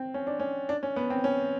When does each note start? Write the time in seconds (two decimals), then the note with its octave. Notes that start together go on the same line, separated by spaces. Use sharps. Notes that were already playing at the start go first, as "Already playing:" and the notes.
Already playing: C4
0.14 C#4
0.27 D4
0.40 C#4
0.69 D4
0.83 C#4
0.96 B3
1.10 C4
1.24 C#4